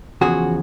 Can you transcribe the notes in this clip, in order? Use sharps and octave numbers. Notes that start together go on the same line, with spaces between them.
E2 C#3 F3 F#4 G#4